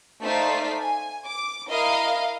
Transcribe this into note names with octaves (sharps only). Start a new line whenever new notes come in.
A3 D#4 C5 D5 F5 B6
G#5
D6
E4 A#4 D#5 F5